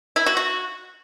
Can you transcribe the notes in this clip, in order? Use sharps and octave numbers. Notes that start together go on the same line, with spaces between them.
E4
F#4
F#4